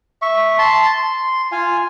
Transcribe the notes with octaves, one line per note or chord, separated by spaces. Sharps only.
E5 C#6
A5 C6
C6
F4 F5 G#5